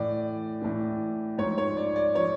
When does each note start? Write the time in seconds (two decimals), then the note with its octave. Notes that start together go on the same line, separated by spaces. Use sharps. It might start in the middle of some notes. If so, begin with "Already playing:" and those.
Already playing: A2 E3 D5
0.61 A2 E3
1.38 G#2 F3 C#5
1.58 C#5
1.77 D5
1.96 D5
2.15 F3 C#5